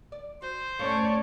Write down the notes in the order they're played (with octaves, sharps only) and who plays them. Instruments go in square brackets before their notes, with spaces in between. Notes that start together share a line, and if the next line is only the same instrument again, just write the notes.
[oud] D5
[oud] F#4 [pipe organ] C5
[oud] A2 A3 F5 [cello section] C#4 C#5 D5